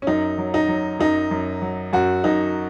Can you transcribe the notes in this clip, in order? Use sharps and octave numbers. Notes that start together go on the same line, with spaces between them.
C#4
F#2 D#4
F#3
D#4
F#3
F#2 D#4
F#2
F#3
F#2 F#4
F#2 D#4